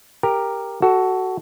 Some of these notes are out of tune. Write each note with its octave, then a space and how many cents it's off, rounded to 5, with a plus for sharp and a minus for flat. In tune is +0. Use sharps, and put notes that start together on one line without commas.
G4 +10 A#4 +0
F#4 +15 A4 +0